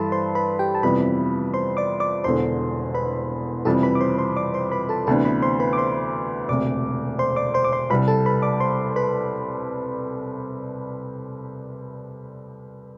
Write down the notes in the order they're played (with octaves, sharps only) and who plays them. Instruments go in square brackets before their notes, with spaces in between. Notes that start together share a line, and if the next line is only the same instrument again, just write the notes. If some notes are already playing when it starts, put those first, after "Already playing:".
Already playing: [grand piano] G2 E3 G3 [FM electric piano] A4 A5 B5 C6
[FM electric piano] C5 C6
B4 B5
G4 G5
A5
[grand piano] F2 C3 E3 G3 B3 [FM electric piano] B4 B5
[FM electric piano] C5 C6
D5 D6
D5 D6
[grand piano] E1 E2 D3 [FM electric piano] C5 C6
[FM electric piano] B4 B5
[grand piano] F2 C3 E3 G3 [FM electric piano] A4 A5
[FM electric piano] B4 B5
D6
C5 C6
C5 C6
D5 D6
C5 C6
B4 B5
A4 A5
[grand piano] D2 C3 E3 B3 D4 [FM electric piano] A4 A5
[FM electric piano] B4 B5
C5 C6
B4 B5
D6
C5 C6
[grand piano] E1 D2 C3 [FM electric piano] D5 D6
[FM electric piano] C5 C6
D5 D6
C5 C6
D6
C5 C6
[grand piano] C2 C3 G3 [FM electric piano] B4 B5
[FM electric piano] A4 A5
B4 B5
D5 D6
C5 C6
B4 B5